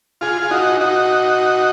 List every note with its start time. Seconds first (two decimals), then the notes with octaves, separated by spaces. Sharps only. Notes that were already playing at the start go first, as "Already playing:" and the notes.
0.21 F4 G#4
0.42 F4
0.51 D#4 F#4
0.81 D#4 F#4